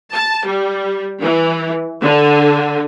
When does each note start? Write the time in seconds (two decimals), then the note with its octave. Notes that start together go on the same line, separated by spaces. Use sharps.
0.13 A5
0.45 G3
1.20 E3
2.01 D3